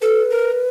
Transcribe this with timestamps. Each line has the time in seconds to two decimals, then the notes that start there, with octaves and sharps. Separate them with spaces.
0.01 A4 B4
0.31 A#4